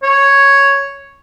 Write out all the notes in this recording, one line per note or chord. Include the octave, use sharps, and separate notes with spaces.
C#5